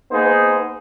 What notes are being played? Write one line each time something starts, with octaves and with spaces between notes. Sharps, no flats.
A#3 B3 D#4 G#4 C5